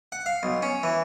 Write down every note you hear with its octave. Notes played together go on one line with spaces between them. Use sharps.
F#5
F5
B1
C#4
E3